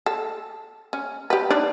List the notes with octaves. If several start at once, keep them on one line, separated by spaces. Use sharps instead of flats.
A4
C#4
G4 B4
D4 D#4 D5